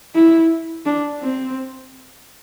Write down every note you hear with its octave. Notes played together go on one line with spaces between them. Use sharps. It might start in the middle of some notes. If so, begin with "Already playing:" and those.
E4
D4
C4